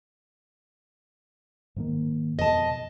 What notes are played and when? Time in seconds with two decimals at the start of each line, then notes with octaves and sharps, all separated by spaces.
1.76 G#2 D#3 A#3
2.39 F2 B2 D#5 A5